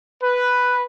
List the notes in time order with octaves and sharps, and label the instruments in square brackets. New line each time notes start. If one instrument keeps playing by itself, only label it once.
[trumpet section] B4